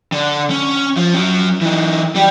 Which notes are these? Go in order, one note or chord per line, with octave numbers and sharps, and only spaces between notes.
D3
C#4
F3
F#3 C#4
E3 D#4
G3 G4